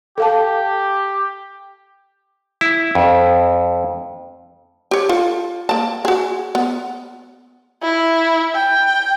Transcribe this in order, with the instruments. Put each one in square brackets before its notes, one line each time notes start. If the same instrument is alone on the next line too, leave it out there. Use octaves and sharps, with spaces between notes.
[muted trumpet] G4 [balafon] A4 F5 A5
[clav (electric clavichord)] E4
F2
[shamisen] G4 C#5
F4 A4
A#3 A5
F#4 G#4
B3
[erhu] E4
G5